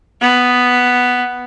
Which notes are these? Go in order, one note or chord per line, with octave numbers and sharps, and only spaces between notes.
B3